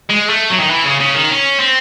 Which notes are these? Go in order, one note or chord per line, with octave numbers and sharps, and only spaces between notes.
G#3
A3
F#3
D#3
E3
C#3
C#3
D#3
C#4
C4